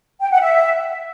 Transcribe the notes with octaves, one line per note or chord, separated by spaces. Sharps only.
G5
F#5
E5